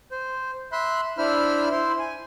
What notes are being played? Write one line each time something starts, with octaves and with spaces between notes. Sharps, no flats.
C5
E5 B5 C6 F#6
D4 E4 C5 E5 B5 F6
E4 C5 C6
G#5